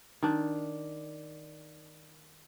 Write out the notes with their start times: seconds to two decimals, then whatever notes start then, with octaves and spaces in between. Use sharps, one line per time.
0.22 D#3 D4